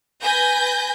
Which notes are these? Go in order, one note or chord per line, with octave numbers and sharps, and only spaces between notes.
B4 G#5 G6 A#6